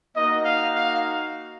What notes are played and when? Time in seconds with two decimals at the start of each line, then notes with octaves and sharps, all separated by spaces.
0.15 A#3 D#4 F#4 D#5
0.45 F5
0.74 F5